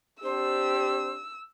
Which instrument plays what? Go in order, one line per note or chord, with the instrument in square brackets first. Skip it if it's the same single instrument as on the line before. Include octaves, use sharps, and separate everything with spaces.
[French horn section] C4 D4 G4 [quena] C5 [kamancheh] E6